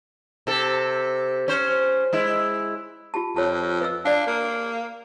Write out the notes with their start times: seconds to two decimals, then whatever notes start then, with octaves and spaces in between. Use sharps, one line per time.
0.47 C3 A4
1.48 C#4 C5
2.13 G#3 E4
3.14 F4 G4 A5
3.36 F2 C#5 A5
3.81 B4 D#5 E6
4.05 D4 D5 F5
4.27 A#3